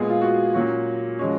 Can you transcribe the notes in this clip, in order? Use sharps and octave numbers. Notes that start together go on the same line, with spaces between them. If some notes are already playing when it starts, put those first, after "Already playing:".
Already playing: A#2 G#3 B3 G#4
F4
F#4
A#2 F#3 C#4 F#4
F3 G#3 C#4